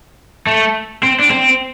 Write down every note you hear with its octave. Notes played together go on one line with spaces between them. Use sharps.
A3
C4
D4
C4